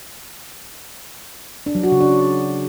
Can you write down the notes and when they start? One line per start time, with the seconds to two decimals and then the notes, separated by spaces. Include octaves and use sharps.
1.66 D4
1.75 F#3
1.83 F#4
1.92 C#3
2.00 D4